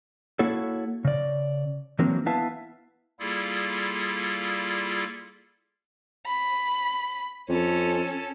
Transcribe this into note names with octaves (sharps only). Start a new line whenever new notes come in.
A#3 E4 F#4 A4 C#5
C#3 D5
E3 F#3 A#3 C4 D4
B3 E4 B4 E5 F5 A5
G3 A#3 E4 F4 G#4 A4
B5
F2 C#4 A4